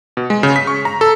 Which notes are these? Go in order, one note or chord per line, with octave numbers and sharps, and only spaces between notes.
B2
G#3
C#3
B6
C#6
A#5
A4